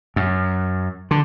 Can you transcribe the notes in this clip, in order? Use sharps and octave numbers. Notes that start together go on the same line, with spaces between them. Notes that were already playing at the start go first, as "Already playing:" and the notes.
F#2
D3